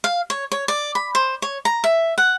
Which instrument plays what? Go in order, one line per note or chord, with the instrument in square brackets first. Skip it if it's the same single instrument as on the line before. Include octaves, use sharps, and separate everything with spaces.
[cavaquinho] F5
C#5
C#5
D5
B5
C5
C#5
A#5
E5
F#5